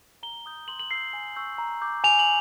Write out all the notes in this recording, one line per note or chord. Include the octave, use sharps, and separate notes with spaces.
A#5 G7
D#6 G6
C6 F#7
F#7
E6 G6 C7
G#5
C#6 E6 G6
A#5
D6 G6
G#5 F7
F#7